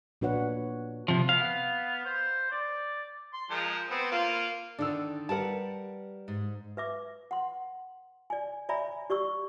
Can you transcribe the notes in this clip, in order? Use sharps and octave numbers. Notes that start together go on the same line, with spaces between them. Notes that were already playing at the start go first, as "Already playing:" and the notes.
A#2 D4 F#4 B4 C#5 F#5
C3 F3
B3 F5
C5
D5
C6
F3 G#3 A#4
B3 C4
A#3 F4
D3 D#3 D4 E6
G3 A#4 B4 F#5 A5
G#2
B4 E5 D6
F#5 C6
D5 G#5
C#5 D5 E5 G#5 A#5 B5
G4 D5 C#6 E6